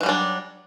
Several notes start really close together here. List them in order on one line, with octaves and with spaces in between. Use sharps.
E3 G3 F#3 D4